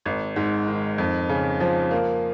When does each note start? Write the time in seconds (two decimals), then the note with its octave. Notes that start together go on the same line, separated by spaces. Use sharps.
0.06 G#1
0.36 G#2
0.68 D#3
0.98 F2
1.29 C#3
1.60 F3
1.91 A#3